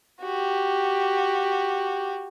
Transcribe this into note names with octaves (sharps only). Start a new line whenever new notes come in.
F#4 G4